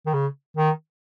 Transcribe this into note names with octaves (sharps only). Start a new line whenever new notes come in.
D#3
C#3
D#3